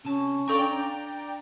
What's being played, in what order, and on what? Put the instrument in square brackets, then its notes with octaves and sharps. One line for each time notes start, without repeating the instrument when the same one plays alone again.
[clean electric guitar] C3 A5 [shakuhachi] C#4
[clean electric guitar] D4 F5 [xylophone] A4 C#6 [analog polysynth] D5 G5 A#5